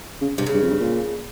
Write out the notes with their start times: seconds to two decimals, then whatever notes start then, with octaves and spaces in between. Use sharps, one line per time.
0.22 C#3
0.38 G2 C3
0.46 C#3
0.54 G2
0.62 F2
0.71 G2
0.80 A#2